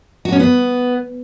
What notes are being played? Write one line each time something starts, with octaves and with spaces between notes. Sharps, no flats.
F#4
C#4
B3